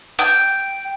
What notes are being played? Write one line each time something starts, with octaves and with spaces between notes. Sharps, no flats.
G5